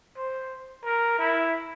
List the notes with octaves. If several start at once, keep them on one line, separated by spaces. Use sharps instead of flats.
C5
A#4
E4